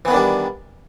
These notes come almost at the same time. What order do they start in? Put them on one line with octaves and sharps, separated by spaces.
E3 B3 D#3 D4 G3